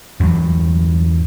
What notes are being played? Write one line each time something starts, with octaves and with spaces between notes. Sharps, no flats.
E2 G2 F#3